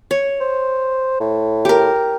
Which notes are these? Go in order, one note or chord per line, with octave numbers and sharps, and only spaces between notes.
C#5
C5
A2
G4 A#4